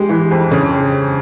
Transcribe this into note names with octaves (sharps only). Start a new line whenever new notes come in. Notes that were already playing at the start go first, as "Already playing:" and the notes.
Already playing: G#3 G4
E3
F2
C#3